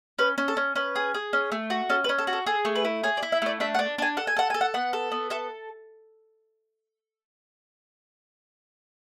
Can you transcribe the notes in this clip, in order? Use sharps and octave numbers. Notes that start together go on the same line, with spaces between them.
C#4 B4
C#4
A4
C#4
C#4 B4
G#4
G#4
C#4
A3
F#4
C#4 A4
B4
C#4
A4
F#4
A4
G#4 A4
A3
B4
E4
G#4 C#5
D5
E4
E5
A3 D5
D4 E5
F#5
D4
D4 G#5
A4 F#5
G#5
A4 F#5
A4 G#5
F#5
B3 F#5
A4
B3
A4 E5